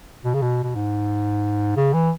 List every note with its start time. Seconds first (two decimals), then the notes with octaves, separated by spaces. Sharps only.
0.25 B2
0.34 C#3
0.42 B2
0.63 B2
0.75 G#2
1.76 C#3
1.93 E3